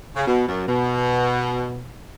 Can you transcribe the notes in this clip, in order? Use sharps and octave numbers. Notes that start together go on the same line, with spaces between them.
C#3
B2
F#2
B2